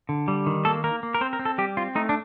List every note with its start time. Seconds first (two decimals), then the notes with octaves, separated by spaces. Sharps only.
0.09 D3
0.28 G3
0.46 D#3
0.65 A#3 A4
0.84 A#3 A#4
1.03 A#3
1.14 A#4
1.21 C4 C5
1.33 A#4
1.39 C4
1.45 A4
1.58 G3 G4
1.77 C4 F4
1.95 A3 D#4
2.09 D4